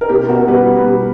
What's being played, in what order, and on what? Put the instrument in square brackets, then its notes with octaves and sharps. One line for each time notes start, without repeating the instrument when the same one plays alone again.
[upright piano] A#4
B2 G4
B2 F#4 A#4
G3 G4 B4
B2
G3